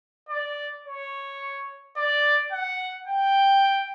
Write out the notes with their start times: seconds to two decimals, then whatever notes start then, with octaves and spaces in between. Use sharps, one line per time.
0.29 D5
0.85 C#5
1.97 D5
2.52 F#5
3.08 G5